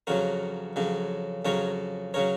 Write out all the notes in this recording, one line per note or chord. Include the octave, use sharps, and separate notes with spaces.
F2 C#3 F#3 F#4 A#4
F2 C#3 F#3
F2 C#3 F#3 A#4 C#5
C#3 F#3 A#4 C#5